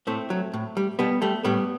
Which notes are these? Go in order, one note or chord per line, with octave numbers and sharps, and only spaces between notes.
A2 A3 C4
F#3
A2
G3
B2 G3 B3
G3 A3
A2 G3 B3